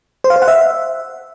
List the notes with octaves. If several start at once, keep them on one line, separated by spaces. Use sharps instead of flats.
C5
F5
C5
F#5
E5